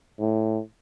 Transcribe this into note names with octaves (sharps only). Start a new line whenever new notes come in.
A2